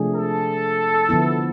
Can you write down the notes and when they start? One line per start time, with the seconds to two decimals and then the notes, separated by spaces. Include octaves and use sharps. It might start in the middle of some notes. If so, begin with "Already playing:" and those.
Already playing: C3 F3 A3 D4 G#4
0.16 A4
1.09 D3 F3 B3 E4